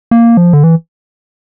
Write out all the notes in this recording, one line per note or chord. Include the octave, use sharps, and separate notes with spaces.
A#3
F3
D3
E3